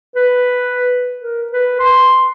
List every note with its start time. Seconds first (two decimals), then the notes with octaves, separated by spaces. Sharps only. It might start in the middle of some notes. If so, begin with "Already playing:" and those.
0.15 B4
1.21 A#4
1.52 B4
1.80 C6